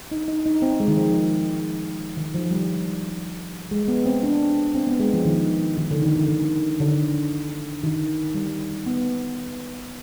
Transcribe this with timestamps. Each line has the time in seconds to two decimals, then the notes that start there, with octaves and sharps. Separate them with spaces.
0.12 D#4
0.28 D#4
0.46 D#4
0.62 C4
0.80 G#3
0.88 D#3
0.97 F3
2.17 D#3
2.34 F3
2.51 G3
3.71 G#3
3.88 B3
4.06 C4
4.23 D4
4.74 C4
4.87 B3
5.00 G#3
5.14 F3
5.25 D#3
5.78 D#3
5.91 D3
6.03 D#3
6.16 D#3
6.29 D#3
6.80 D3
7.84 D#3
8.35 G3
8.86 B3